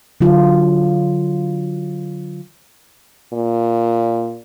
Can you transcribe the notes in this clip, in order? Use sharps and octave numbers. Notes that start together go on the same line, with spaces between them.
D3 F#3 F4
A#2